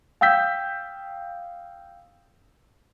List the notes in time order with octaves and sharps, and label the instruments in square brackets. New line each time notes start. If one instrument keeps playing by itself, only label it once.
[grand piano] F5 G5 E6 G6 B6